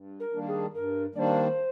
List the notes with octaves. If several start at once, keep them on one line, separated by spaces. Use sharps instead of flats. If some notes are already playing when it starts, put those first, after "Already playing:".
Already playing: G2
A#4
D#3 G3 A#3 D4
G#4
G2 A#4
D#3 G3 A#3 D4 C5 D5